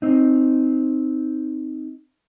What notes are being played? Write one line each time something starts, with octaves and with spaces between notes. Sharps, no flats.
C4 D#4